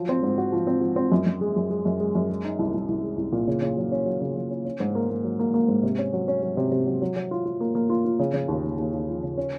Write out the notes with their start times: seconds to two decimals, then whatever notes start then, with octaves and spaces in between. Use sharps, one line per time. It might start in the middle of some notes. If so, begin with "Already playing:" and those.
Already playing: F3 F#3
0.09 C4
0.23 G#2
0.38 F#4
0.52 F3
0.67 C4
0.81 F3
0.96 C4
1.12 F#2
1.26 F#2
1.41 G#3
1.56 F#2
1.70 G#3
1.85 F#2
2.00 G#3
2.15 F#2
2.30 G#3
2.44 D#4
2.59 C2
2.74 C2
2.88 C2
3.03 G#3
3.17 C2
3.32 A#2
3.47 C#3
3.62 C#3
3.77 F#3
3.92 C#4
4.06 F#3
4.21 C#3
4.36 F#3
4.51 C#4
4.65 C#4
4.80 G#2
4.95 A#3
5.10 A#3
5.24 F#3
5.39 A#3
5.54 A#3
5.68 G#2
5.83 C3
5.98 C#4
6.13 F#3
6.28 C#4
6.43 F#3
6.57 C3
6.72 C3
6.86 F#3
7.02 F#3
7.16 F#3
7.31 F4
7.46 F4
7.60 A#3
7.75 A#3
7.90 F4
8.05 F4
8.19 C#3
8.34 C#3
8.48 D#2
8.64 D#2
8.78 D#2
8.94 D#2
9.08 F3
9.23 C#3
9.37 C#4